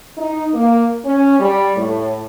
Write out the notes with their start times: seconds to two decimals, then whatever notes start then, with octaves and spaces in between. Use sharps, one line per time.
0.18 D#4
0.54 A#3
1.05 C#4
1.40 G3
1.77 A2